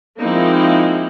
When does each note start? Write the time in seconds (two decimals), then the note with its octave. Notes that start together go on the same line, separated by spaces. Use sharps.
0.21 F3 G#3 A#3 C4 D#4 E4